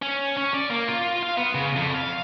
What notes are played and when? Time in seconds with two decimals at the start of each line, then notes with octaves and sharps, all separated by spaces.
0.02 C#4
0.37 C#4
0.54 D5
0.70 A#3
0.88 F4
1.23 F5
1.37 B3
1.55 C#3
1.76 F2
1.94 F5